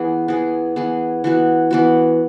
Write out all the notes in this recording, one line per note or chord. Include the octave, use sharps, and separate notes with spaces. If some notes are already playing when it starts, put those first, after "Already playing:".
Already playing: E3 B3 G#4
E3 B3 G#4
E3 B3 G#4
E3 B3 F#4
E3 B3 F#4